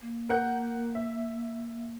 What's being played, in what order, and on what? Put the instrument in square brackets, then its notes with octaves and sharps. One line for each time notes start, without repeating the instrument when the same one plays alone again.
[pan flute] A#3
[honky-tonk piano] A#4 F#5 G6
E5